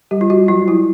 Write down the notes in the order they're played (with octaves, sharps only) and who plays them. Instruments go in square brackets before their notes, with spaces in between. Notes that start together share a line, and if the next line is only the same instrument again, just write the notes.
[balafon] G3 G4
F4
G3 F#4
F#3 F4
F#3 E4